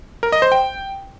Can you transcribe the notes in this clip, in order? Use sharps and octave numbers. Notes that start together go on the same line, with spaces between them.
A#4
D#5
C5
G5